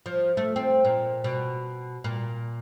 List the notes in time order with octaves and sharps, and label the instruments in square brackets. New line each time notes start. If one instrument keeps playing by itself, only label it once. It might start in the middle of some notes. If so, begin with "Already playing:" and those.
[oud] F3
A3
C4
A#2
B2
A#2